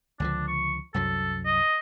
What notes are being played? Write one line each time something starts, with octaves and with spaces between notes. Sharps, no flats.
C#2 D3 F3 D4
C#6
C2 F#2 F#3 A4
D#5